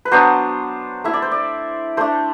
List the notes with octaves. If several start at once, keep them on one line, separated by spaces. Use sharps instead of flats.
B4
F#3 B3 D4 C5
A3 E4 E5
D5
C5
D5
A3 D4 C5